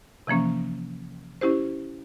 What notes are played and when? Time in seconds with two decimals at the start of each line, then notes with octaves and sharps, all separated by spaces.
0.27 C3 E3 F3 A#3 C#4
1.41 C#4 E4 G4 C5